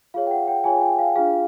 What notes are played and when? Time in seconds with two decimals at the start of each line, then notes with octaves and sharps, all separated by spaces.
0.14 F4 G#4 C#5 F5
0.27 G5
0.31 F#5
0.48 G5
0.64 F4 G#4 C#5 G#5
0.81 G5
0.99 F5
1.16 D4 F4 G#4 F5